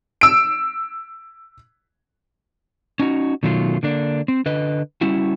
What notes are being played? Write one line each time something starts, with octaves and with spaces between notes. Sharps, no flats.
E6 D7
C#4 D#4 F#4
B2 D#3 F#3 A3 D#4 F4
D3 A#3 D4
C4
D3 B4 D#5
G3 C#4 E4 F#4